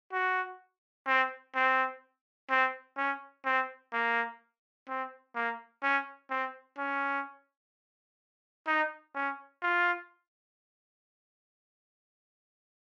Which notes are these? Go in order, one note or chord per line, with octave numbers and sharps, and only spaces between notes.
F#4
C4
C4
C4
C#4
C4
A#3
C4
A#3
C#4
C4
C#4
D#4
C#4
F4